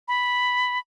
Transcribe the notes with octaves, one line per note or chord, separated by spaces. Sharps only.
B5